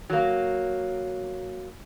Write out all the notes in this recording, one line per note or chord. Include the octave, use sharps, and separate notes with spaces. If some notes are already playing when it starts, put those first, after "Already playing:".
F#3 A#3